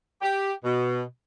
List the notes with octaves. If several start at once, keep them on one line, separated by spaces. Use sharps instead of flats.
G4
B2